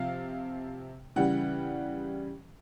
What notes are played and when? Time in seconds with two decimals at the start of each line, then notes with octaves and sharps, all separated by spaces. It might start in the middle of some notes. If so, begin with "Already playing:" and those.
Already playing: C3 F3 F5
1.16 C#3 E3 G3 F#5